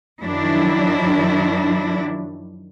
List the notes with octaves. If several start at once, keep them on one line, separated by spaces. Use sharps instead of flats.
F#2 D#3 F3 F#3 D4 E4